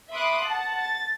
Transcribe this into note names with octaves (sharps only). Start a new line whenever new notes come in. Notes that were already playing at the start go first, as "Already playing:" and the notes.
E5 B5 C6 D6 D#6 F#6
F#5 A5
A6